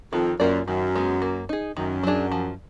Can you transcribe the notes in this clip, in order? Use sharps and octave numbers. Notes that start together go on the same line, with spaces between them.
F2 D#3
F#2 A#3 F4 A#4 D5
F#2 D#3
G#3 B3
A#3
D#4 G#4
F#2 D#3
F#3 D4 G#4
F3